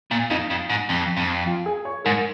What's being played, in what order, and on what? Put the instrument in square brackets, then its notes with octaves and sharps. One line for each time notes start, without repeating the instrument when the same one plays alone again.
[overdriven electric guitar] A#2
[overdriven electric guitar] F2 [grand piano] D#4
[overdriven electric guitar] F2
G#2
F2
F2
[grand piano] F4
G#4
C#5
[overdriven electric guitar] G#2 [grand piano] A#4